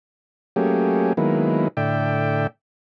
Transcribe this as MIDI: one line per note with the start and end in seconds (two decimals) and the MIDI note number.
0.56 1.13 54
0.56 1.13 57
0.56 1.13 58
0.56 1.13 61
0.56 1.13 67
0.56 1.13 68
1.17 1.68 51
1.17 1.68 54
1.17 1.68 56
1.17 1.68 58
1.17 1.68 59
1.17 1.68 64
1.77 2.47 45
1.77 2.47 50
1.77 2.47 74
1.77 2.47 76
1.77 2.47 79